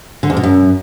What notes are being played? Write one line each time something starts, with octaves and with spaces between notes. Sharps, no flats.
D3
E2
B2
F#2